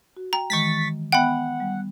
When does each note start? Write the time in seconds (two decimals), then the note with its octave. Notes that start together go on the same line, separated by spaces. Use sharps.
0.17 F#4
0.33 G5 A#5
0.50 D#3 E3 G#3 C#6 A6 B6
1.12 B3 E5 F#5 G5 B5
1.60 G3